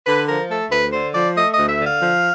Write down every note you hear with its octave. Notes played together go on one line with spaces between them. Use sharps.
D3 B4
F3 A#4
A3 A4
D2 B4
D3 C5
F3 D5
A3 D#5
D#5
D2
E5
D3
F5
F3